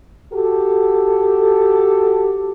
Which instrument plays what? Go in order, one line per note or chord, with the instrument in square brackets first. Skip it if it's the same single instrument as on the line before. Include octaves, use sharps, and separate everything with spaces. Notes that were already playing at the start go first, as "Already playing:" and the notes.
[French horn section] F#4 G4 A4